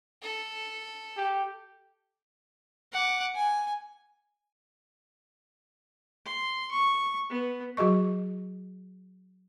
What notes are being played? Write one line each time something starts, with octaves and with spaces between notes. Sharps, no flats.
A4
G4
F#5 D6
G#5
C6
C#6
B3
F#3 F#4 G#4 D#5 C#6